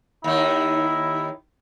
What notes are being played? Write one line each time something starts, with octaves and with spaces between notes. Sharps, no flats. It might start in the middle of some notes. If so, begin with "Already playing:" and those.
D#2 D#3 E4